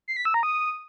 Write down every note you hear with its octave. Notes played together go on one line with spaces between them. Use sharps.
C7
B6
E6
A#5
D#6